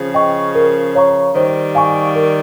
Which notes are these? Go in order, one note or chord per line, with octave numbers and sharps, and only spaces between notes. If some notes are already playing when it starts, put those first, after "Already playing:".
Already playing: C#3 F3
D#5 G5 C#6
A#4
C#5 F5 A#5 C#6
D#3 G3 C5
F5 G#5 C#6
A#4